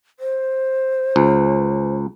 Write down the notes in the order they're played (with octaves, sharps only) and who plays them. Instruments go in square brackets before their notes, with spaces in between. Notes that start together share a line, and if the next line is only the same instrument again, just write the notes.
[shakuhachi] C5
[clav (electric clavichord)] C#2